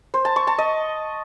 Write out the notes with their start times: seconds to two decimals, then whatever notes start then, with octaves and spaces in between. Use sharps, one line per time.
0.14 C5
0.25 A5
0.36 C#6
0.47 A5
0.58 D#5